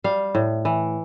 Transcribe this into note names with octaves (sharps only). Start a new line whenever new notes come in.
G3 F5
A2
E3